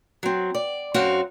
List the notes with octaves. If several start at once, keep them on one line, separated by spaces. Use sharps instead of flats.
F#3 C4
D5
F#2 C4 F#4 F5